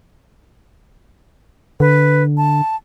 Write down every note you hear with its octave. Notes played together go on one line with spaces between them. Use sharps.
D3 B4
A5